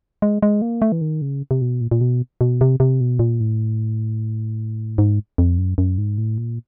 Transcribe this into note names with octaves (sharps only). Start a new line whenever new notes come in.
G#3
G#3
A#3
A3
E3
D#3
C#3
C3
B2
A#2
A#2
B2
B2
C3
C3
B2
A#2
A2
G#2
F2
F#2
F#2
G#2
A2
A#2